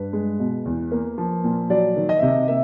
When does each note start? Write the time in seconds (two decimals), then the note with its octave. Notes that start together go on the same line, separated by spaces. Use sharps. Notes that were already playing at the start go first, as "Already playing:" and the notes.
Already playing: G2 B4
0.13 G#3
0.40 B2
0.65 E2
0.92 A#3
1.18 F3
1.44 A#2
1.70 F#3 D5
1.96 D#3
2.09 D#5
2.19 C3 E5
2.28 D#5
2.48 A#3 E5